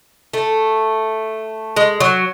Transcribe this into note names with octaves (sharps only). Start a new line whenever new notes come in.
A3
G#3
F#3